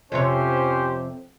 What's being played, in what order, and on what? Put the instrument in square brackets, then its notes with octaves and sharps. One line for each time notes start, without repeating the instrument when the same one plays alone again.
[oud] F2 C3 C#5 [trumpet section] C#4 G4 C5